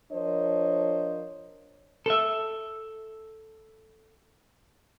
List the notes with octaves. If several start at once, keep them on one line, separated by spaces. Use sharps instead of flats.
F3 D4 A#4 C5 C#5 D#5
A4 E5